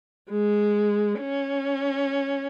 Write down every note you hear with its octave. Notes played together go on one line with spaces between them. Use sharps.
G#3
C#4